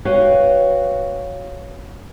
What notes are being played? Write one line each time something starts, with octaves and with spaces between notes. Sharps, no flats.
F#4 B4 C#5 F5 G5